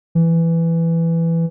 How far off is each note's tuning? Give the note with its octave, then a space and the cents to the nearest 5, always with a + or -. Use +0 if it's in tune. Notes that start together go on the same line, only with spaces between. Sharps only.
E3 +10